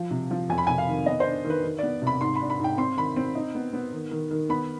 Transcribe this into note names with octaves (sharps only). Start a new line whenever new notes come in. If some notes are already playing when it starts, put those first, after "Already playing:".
Already playing: F3
C3
F3
F2 G#5
B5
C3 G#5
F5
D#3
B3 D#5
C5
D4
D#3
B4
D#3
B3 D5
C3 B5
G#2 C6
D4 B5
B5
G#2 G5
C4 C6
D#3 B5
C4
D#4
B3
B3
D#3
D#3
D#3
B3 B5